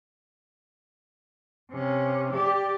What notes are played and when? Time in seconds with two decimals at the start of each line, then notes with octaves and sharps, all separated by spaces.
1.71 C3 C#4
2.33 G4 D5